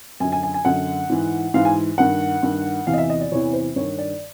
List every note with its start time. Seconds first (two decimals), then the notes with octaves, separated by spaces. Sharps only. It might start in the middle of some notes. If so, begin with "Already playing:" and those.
0.20 F#2 G#5
0.25 D3
0.32 G#5
0.43 G#5
0.54 G#5
0.65 F#2 D3 F#5
1.10 G#2 E3
1.54 G#2 E3 F5
1.65 G#5
1.98 G2 D#3 F#5
2.43 G2 D#3
2.87 E2 C3 E3 F5
2.94 D#5
2.98 E5
3.10 D#5
3.21 D5
3.32 E2 C3 E3 C#5
3.53 C5
3.76 G2 D#3 C#5
3.98 D5